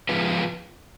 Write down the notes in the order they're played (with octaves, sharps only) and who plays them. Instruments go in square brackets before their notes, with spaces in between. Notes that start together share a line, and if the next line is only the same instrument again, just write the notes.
[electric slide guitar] F3 G#3 B3 F4 B4